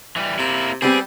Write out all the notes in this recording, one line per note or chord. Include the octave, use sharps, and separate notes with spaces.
E3 F#3 G3
C3 A#3 E4
G3 B3 C4 G4 G#4